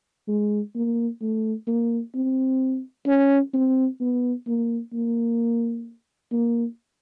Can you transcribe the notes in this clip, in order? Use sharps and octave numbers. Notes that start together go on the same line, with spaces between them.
G#3
A#3
A3
A#3
C4
C#4
C4
B3
A#3
A#3
A#3